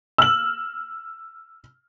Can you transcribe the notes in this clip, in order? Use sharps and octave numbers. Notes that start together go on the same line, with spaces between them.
E6 F6 F#7